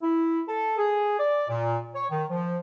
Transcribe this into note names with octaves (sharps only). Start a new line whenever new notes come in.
E4
A4
G#4
D5
A#2
C#5
D#3
F3